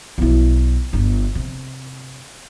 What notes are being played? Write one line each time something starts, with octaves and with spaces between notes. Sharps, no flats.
B1 E4
G1 D4
C3